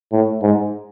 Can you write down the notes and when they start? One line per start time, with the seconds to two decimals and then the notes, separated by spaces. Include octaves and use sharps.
0.12 A2
0.42 G#2